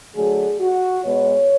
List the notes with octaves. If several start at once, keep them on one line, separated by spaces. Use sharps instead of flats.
D3 F#3 A3 G#4
F#4
B2 G#3 B3 C#5